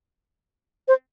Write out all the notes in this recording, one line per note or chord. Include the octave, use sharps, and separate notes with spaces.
C5